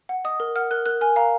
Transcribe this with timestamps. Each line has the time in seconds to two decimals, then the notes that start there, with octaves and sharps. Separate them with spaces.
0.09 F#5
0.25 D#5 D#6
0.40 A#4
0.56 F#5 F6
0.71 A#4 F#6
0.86 A#4 F#6
1.01 A#4 G#5
1.16 F5 A#5